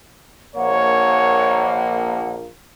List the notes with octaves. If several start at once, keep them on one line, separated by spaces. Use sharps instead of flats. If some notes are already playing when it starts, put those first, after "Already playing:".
A#1 A#3 C#5 F#5